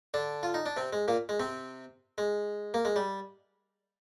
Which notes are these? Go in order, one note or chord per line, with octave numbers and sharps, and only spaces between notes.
D3 D4
F4
D#4
D4
C3 C4
G#3
A#2 A#3
G#3
C3 C4
G#3
A#3
G#3
G3